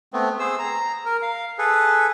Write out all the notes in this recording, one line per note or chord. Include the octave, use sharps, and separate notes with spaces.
A3 B3 C4
G#4 C5 E6
A#5
A#4
F5
G#4 A4 B4